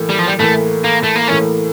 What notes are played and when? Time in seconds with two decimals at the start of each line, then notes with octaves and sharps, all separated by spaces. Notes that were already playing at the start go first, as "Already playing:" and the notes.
Already playing: A2 E3 A#3
0.09 G3
0.19 F3
0.27 G3
0.39 A2 E3 A3 A#3
0.84 A#3
1.04 A3
1.16 A#3
1.28 A2 E3 A#3 C#4